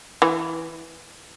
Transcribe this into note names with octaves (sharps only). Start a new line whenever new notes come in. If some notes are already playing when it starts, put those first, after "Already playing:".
E3